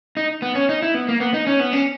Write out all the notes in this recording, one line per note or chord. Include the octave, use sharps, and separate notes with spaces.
D#4
B3
C#4
D#4
E4
B3
A#3
B3
D#4
C#4
B3
C#4